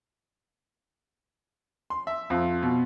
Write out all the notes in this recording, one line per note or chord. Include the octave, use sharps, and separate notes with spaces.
C6
E5
F2
B2